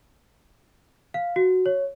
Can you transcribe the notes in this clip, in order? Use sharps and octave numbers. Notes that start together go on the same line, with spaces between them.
F5
F#4
C#5